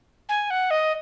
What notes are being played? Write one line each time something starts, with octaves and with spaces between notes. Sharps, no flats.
G#5
F#5
D#5